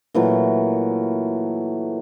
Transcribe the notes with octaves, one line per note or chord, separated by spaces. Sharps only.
A#2 E3 F#3 A3